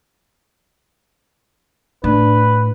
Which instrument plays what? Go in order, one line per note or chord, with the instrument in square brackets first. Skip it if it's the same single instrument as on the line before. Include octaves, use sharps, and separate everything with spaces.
[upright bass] A2 [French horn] D4 [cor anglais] B4